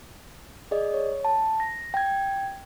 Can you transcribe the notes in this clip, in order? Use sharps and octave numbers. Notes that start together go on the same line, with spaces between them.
G#4 D5 D#5
C#5
A5
A#6
G5 G#6